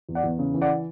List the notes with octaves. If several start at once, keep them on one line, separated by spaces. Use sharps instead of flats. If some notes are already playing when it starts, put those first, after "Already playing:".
E2
D5 F#5
E2
C#3
E3
D5 F#5